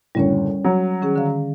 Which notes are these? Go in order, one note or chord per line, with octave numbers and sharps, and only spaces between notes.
F#1 D2 A2 G3 C#4 C#5
F#3
D#3 C#4 G#4
D3 F5